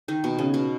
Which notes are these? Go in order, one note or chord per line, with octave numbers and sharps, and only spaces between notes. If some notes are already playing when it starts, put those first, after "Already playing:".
D#3 D#4
B2 B3
C#3 C#4
B2 B3